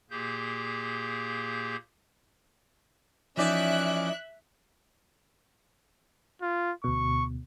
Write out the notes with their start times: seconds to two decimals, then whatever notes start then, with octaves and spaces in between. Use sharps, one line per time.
0.10 A#2 A#3 G4 G#4 G6
3.37 E3 F3 C#4 D#4 D5 E5 D6 F#6
6.42 F4
6.84 D2 B2 C#6